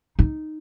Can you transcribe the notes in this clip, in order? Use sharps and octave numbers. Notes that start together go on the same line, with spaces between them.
D#4